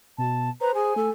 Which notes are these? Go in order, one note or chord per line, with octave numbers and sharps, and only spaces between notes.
B2 A5
B4 C5 A#5
G#4 G#5
A3 A4